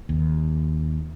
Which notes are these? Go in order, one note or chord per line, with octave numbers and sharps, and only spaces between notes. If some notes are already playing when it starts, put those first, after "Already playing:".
D#2